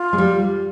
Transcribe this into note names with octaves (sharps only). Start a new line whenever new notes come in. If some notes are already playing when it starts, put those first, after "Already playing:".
Already playing: F4
G#3
G3